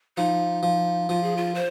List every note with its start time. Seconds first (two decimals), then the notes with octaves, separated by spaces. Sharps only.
0.17 F3 D#4
0.63 F3
1.09 F3 F4
1.23 G#4
1.37 F4
1.55 C5